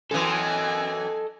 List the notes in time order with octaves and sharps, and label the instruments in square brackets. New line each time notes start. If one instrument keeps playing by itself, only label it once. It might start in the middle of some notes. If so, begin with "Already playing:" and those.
[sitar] F#2 E3 [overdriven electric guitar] A4 D#5 [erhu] G#5